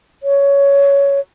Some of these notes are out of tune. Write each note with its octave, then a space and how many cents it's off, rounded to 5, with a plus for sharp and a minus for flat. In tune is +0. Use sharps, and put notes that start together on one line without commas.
C#5 +15